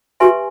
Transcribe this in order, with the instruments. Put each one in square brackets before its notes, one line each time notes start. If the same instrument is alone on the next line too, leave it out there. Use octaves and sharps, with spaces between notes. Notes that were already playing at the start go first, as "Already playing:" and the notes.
[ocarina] F#4 [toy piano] G4 B4 E5 G#5 C6